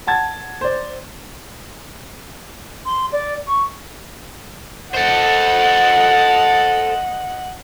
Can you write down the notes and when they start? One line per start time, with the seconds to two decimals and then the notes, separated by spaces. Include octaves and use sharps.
0.07 F#5 A5 G#6
0.61 C5 D5
2.86 C6
3.12 D5
3.47 C#6
4.94 A4 C5 D#5 F#5